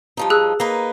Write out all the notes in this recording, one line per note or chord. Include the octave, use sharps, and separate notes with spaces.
G2 F3 D#4
G#4 E6 F#6
A#3 D#4 B4